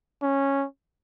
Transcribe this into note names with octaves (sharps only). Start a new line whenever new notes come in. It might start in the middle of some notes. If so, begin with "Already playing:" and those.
C#4